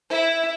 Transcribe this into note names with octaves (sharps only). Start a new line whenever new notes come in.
E4